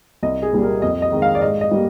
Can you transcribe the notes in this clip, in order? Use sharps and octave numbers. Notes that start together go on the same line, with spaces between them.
C2 D#5
G#4
A#2 G3 A#3
A#4
F2 D#5
D#5
D#3 G#3 C4
F5
D5
G#2 D#5
D#5
G3 A#3